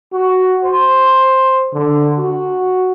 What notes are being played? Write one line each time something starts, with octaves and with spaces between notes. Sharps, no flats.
F#4
C5
D3
F#4